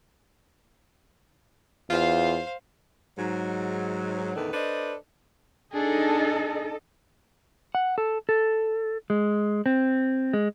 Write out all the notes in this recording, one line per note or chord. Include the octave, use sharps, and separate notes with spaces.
E2 F4 C5 F5
G#2 F#3
E2 A2 D3 D#3 D#4 B4
D4 A4 B4 C5 D5 D#5
D4 D#4 G#4 A4 D#5
F#5
A4
A4
G#3
C4
G#3